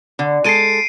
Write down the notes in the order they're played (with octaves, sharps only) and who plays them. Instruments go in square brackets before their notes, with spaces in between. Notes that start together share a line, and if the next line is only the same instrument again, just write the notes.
[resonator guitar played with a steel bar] D3
[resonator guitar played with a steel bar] G#3 A4 [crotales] C7 D7 D#7